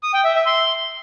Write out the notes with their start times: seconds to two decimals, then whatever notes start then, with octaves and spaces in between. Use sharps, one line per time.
0.03 D#6
0.14 G5
0.25 E5
0.35 E5
0.46 C6